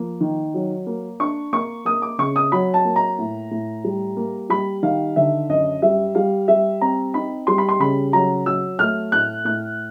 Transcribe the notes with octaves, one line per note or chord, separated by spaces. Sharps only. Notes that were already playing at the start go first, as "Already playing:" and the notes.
Already playing: F3 A#3
D#3
F#3
A#3
D4 C#6
A#3 C#6
A#3 D#6
D6
C#3 C#6
D#6
F#3 B5
A5
A#3
A#5
A2
A2
G3
A#3
G3 B5
D#3 F5
D3 E5
F#2 D#5
G3 E5
G3 F5
G3 E5
C4 A#5
D#4 B5
G3 C6
B5
C6
C#3 B5
F#3 A#5
F#3 E6
A3 F6
A2 F#6
A2 F#6